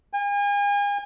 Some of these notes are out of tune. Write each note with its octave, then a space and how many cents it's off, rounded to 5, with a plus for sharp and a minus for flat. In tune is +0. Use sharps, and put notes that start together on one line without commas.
G#5 -40